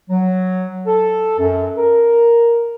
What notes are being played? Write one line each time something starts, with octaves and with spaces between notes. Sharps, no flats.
F#3
A4
F#2
A#4